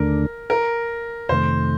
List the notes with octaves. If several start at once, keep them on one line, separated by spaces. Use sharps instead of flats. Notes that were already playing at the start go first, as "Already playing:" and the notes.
Already playing: D#2 D3 A3 D4 A#4
A#4
F2 C3 D#3 A3 C5